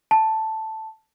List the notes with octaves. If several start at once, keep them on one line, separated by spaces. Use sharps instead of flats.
A5